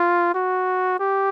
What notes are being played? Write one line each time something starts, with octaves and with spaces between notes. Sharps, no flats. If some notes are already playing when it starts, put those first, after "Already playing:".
Already playing: F4
F#4
G4